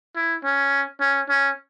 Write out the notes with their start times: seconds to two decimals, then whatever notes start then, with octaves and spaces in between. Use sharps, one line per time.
0.15 E4
0.44 C#4
1.00 C#4
1.29 C#4